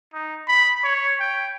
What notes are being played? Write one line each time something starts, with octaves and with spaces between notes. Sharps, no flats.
D#4
B5
C#5
G5